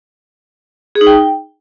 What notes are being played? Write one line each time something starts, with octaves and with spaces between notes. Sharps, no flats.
G#4
D#4
G5